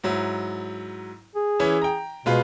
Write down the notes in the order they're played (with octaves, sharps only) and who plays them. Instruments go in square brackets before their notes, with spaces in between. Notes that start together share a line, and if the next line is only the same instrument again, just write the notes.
[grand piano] G#2 F#3 E4
[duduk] G#4
[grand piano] E3 C#4 E4
G5 A#5
[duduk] B2 [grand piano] G#3 F4 B4